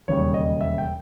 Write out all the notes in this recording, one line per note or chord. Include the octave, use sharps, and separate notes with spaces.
E1 D#2 C#3 G3 C#5
D#5
E5
G5